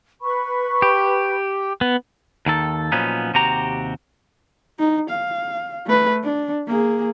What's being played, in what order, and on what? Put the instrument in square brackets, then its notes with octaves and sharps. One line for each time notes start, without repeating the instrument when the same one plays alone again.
[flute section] B4 B5 C#6
[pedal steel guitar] G4
B3
[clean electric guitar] D#2 D#3 A4
A#2 F3 F#3 B3 C#4 D#4
D#2 C3 F#4 G4 A#5
[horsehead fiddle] D#4
F5
A3 B4
D4
A#3 G#4